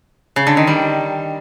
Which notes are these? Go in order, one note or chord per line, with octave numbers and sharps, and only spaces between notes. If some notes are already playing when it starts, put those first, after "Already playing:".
C#3
D3
D#3
G3